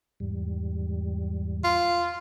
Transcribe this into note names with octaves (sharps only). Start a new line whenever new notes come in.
E2 G#2 G3
F4